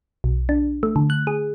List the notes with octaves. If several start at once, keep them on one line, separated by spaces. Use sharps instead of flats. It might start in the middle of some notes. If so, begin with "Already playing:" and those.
B1
D4
A3
D3
F#6
G#4